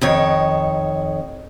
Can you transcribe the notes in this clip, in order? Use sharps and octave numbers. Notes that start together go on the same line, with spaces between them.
F2 D#3 C#5